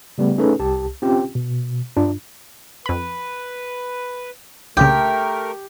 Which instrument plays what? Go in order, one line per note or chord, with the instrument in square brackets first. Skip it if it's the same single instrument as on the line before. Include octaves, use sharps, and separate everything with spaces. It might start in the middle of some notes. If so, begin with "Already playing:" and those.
[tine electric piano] C#3 G3 A3 B3
A3 C#4 D#4 G#4 A4 B4
C2 G4 A5
C4 C#4 F4 G4 G5
B2
G2 D4 F4
[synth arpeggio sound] F2 B5 [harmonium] B4
[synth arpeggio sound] C2 A#2 C#3 [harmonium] A3 A#4 [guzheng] G4